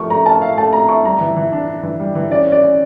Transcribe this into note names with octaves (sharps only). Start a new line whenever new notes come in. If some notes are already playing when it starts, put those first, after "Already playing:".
Already playing: F3 A3 A#4 C#6
A3 A#5
A#4 A5
E4 F5
A3 A5
A3 A#5
E4 C#6
G3 A#5
E3
E3
D4
D4
E3
G3
E3
C#4 D5
C#4
D5
C#4